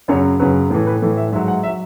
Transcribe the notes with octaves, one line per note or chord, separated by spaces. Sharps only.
F#2 C#3 F#3 C#5
F#2 C#3 F#3 B4
A2 E3 A4
B4
A2 E3 A4
E5
G#2 F#3 E5
F#5
E5
F#3